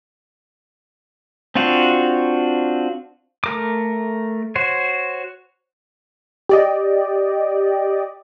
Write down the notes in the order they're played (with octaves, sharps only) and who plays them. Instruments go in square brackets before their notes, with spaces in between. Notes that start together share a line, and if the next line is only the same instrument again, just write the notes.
[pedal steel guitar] C4 D4 F4 F#4
A3 A#4 D6
F#4 C5 C#5
[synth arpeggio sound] G4 D5 D#5